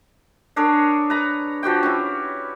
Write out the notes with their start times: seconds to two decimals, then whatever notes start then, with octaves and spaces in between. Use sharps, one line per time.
0.56 D4 G#4 A#4 C#5
1.10 B4 A#5
1.63 F3 F#4 G4 G5
1.83 C#4 E4